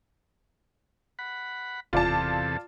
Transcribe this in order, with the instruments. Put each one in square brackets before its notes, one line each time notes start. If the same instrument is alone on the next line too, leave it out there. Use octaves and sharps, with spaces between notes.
[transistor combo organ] F#5 B5
[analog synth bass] F#1 [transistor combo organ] E2 C3 A4 [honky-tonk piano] F4 D5 A5